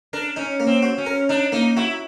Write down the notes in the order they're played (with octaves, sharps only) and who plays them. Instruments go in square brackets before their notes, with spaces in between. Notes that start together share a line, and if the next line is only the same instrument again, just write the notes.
[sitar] D4 [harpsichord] A#4
[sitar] C#4 [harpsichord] D#4
[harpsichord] A#3
[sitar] C4
[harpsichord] F#4
[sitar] C#4
[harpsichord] A#4
[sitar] D4 [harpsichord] D#4
[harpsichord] A#3 [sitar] D#4
[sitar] E4 [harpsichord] F#4